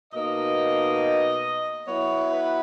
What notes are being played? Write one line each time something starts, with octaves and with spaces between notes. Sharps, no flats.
B2 A#3 D#4 D#5
F#3 B3 E4 C#5
B4